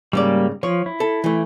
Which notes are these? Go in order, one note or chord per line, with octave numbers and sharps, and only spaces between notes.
G#2 C#3 G3 A#3 D5
F3 C#5
E4
A4
E3 A3